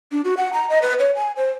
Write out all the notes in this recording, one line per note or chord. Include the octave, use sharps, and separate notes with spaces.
D4
F#4
F#5
A#5
D#5
B4
C#5
G#5
C5